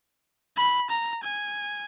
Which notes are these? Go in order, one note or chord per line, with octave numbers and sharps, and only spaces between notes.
B5
A#5
G#5